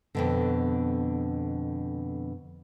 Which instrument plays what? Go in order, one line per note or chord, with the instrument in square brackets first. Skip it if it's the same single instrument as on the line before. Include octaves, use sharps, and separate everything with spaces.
[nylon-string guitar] F2 B2 D3